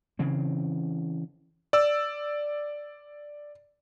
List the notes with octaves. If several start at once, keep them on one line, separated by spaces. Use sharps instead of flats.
C#3 E3 C4
D5 E6